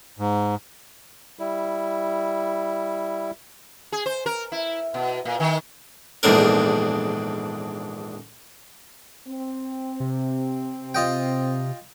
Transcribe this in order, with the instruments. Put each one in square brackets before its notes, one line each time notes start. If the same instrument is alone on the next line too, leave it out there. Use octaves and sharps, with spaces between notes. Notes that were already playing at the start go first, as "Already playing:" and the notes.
[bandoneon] G#2
G3 E4
[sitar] G#4
C5
A#4
E4
B2
A#2
D#3
[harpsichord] A#1 E2 G#2 D3 A#4
[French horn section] C4
[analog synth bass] C3
[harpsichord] F4 D#5 G5